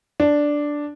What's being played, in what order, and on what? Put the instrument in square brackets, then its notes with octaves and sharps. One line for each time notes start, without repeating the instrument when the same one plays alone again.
[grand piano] D4